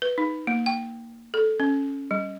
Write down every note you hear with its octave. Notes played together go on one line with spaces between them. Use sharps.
B4
D#4
A#3
G5
A4
C#4
G3